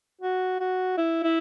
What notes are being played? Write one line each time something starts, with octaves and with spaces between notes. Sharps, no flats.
F#4
F#4
E4
E4